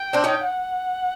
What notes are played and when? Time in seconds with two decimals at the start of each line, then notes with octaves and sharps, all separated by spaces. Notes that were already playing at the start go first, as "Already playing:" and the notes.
Already playing: G5
0.13 C4 D4
0.24 C#4 D#4
0.45 F#5